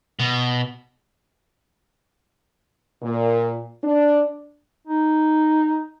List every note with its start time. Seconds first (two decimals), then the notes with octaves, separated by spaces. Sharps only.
0.19 B2
3.02 A#2
3.84 D4
4.87 D#4